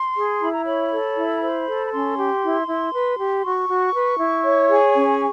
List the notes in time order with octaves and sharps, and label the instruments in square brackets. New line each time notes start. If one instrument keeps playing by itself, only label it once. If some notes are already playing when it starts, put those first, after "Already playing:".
Already playing: [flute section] C6
G#4
E4 B5
A#5
C#5 B5
A4
E4
C5
A4
B5
C#4 C6
G4
E4
E4
B4
G4
F#4 C#6
F#4
B4
E4
C#5
G#4
C#4